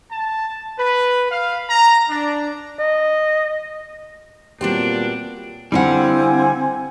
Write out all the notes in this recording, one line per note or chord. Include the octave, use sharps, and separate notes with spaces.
A5
B4
F5
A#5
D4
D#5
A#2 F#3 G3 B3 C4 D4 F#4 G4
D3 G3 C4 E4 F5 F#5 G#5